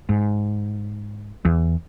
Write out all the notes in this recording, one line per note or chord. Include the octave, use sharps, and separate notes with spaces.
G#2
E2